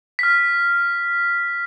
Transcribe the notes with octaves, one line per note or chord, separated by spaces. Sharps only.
F6 B6